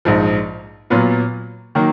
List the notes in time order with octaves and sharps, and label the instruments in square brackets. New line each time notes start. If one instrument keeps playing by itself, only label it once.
[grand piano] A#1 G#2 F3
A#2 F#3 B3 F4
D#3 F#3 A#3